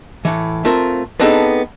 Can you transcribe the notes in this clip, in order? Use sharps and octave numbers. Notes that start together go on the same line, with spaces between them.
A2 E3
A3 C4 F4 A#4
B3 C4 D4 D#4 G#4 A4